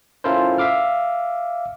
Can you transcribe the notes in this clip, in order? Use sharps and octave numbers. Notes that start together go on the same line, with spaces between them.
C#4 E4 F4 A4 A#4 C5
E5 F5 D6 F6